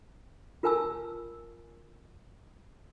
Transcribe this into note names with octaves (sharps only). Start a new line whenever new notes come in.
F4 A#4 B4 G#5 A5 E6